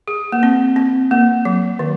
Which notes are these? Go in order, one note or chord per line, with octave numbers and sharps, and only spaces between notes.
G#4
A#3
C4
C4
A#3
F#3
D#3